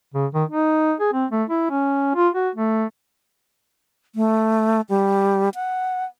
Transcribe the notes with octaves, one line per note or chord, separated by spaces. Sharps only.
C#3
D#3
D#4
G#4
C4
A3
E4
C#4
F4
F#4
A3
A3
G3
F#5